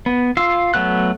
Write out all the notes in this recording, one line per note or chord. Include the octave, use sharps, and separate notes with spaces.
B3
F4 F5 E6
F#3 A3 B3 F#6